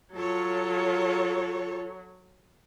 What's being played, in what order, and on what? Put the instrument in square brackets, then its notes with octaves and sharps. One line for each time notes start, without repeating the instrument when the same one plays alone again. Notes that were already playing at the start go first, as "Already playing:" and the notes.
[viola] F#3 [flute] F4 [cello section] A4 C#5